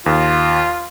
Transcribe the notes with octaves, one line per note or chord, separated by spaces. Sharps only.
D#2 F4